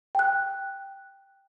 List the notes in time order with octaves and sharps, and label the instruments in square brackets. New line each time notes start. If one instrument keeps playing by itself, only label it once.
[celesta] G5 F#6